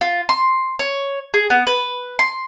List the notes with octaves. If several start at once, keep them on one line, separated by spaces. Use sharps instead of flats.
F4
C6
C#5
G#4
B3
B4
C6